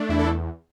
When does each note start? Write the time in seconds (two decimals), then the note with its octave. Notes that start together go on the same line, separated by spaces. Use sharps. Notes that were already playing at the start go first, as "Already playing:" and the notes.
Already playing: A3 D4
0.09 E2 E4
0.19 A4